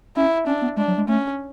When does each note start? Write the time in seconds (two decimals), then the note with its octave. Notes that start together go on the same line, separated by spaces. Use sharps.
0.16 C#4 E4
0.47 C#4 D4
0.62 B3
0.77 G#3 D4
0.88 F#3
0.98 G#3
1.08 A3 C#4